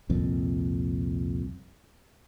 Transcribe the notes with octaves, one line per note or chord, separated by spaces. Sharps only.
C2 F2 A#2